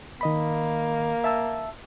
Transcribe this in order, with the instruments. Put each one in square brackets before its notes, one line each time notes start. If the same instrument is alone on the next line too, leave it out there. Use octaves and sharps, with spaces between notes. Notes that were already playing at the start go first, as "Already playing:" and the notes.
[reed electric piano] D#3 D#5 B5 [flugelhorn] A#3
[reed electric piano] E5 A5 E6